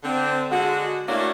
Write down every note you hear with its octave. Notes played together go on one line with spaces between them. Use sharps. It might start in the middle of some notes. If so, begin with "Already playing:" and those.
D3 C4
D3 G#3 F#4
A3 A#3 C#4 D4 E4 F#4